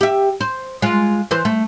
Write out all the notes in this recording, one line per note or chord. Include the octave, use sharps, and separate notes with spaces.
G4 E5
C5
G#3 F4
E3 C5
A3